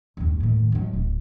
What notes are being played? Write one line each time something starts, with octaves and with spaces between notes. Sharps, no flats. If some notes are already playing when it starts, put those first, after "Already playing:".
F#1 D#2
A2 D#3
B1 F#3
D1